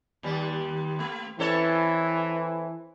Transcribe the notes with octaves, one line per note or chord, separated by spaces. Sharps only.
D#2 G3
A3
E3 C4 A4 C#5